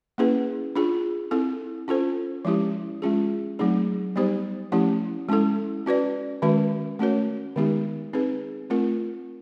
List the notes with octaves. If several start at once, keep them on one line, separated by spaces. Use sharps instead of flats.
A#3 C#4 E4 G#4 B4
D4 F4 G#4
C4 E4 A4
C#4 F4 A4 C5
F3 G#3 C#4 E4 G4
G#3 C#4 F4 G#4
F#3 A3 C4 D#4 G#4
G3 B3 D#4 G4 C5
F3 A3 C#4 E4 G4
G#3 C#4 E4 A4
C#4 F#4 B4 D5
D#3 G#3 C#4 F#4 B4
A3 C#4 F#4 A#4 C#5
D#3 G#3 B3 D#4 G4
C4 D#4 G#4 B4
A3 C4 F4 A#4